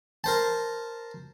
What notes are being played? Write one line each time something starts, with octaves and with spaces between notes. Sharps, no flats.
A#4 C5 A5